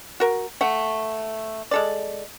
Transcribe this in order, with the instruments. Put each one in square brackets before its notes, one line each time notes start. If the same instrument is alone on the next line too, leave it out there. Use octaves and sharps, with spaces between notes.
[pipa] F#4 A#4
A3 F#5
G#3 A4 D5